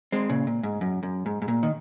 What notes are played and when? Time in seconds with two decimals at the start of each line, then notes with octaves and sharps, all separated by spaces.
0.12 G#3 C4
0.29 A#2 C#3
0.47 A#2
0.63 G#2
0.81 F#2
1.03 F#2
1.26 G#2
1.42 G#2
1.48 A#2
1.63 D#3